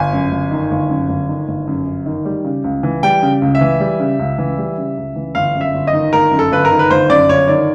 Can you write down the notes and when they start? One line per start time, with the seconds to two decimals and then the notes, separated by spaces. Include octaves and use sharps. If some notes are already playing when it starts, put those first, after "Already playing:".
Already playing: G1 G#5
0.13 F#2
0.31 G1
0.51 D#3
0.71 G1
0.89 F#2
1.09 G1
1.28 D#3
1.48 G1
1.67 F#2
1.87 G1
2.06 D#3
2.25 G3
2.44 C#3
2.64 C#2
2.83 E3
3.03 G3 G5
3.22 C#3
3.42 C#2
3.55 E5
3.61 E3
3.80 G3
4.00 C#3
4.19 C#2
4.39 E3
4.58 G3
4.78 C#3
4.97 C#2
5.16 E3
5.35 G1 F5
5.55 F#2
5.61 E5
5.74 G1
5.87 D#5
5.93 D#3
6.13 G1 A#4
6.32 F#2
6.39 A4
6.51 G1 B4
6.65 A#4
6.71 D#3
6.79 B4
6.90 G1 C5
7.10 F#2 D5
7.29 G1 C#5
7.48 D#3 D5